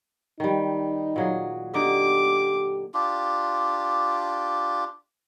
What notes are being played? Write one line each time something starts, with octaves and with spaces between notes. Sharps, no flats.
D#3 G3 D#4
A#2 F#3 G#4
D3 D#4 G4 D6
D4 F4 G4